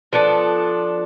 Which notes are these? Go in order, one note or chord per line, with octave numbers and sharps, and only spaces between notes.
F3 B3 D4 A4